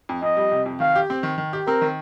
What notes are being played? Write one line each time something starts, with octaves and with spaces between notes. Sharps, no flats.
F2
F2 D#5
G3
C3
F2
D#3 F5
G4
C4
D#3
D#3
G4
C4 A#4
D#3